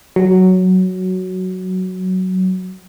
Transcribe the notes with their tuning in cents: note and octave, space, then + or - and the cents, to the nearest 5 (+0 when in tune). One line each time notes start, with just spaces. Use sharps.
F#3 +5